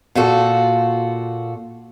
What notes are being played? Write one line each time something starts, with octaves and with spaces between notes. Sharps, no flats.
A#2 F4 F#4 A4